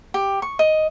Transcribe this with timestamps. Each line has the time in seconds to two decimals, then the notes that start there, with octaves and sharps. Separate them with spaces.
0.14 G4
0.42 C#6
0.59 D#5